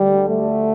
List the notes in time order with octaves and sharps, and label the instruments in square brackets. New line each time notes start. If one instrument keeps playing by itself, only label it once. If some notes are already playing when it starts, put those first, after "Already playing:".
Already playing: [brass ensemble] D2 D3 G3
A3